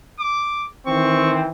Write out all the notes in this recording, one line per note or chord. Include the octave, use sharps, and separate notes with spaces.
D6
D#3 E3 C4 C#6